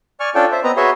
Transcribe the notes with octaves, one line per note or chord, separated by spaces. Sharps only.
D5 G#5 C#6 F6
C#4 D4 F4 A4 D5 G5
C5 E5
B3 C4 B4 D#5 A#5
F#4 G#4 B4 C#5 E5 C6